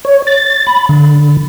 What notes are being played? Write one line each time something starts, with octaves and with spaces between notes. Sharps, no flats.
C#5
A6
B5
D3